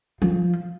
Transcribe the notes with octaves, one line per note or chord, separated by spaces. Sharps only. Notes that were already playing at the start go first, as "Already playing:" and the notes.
F3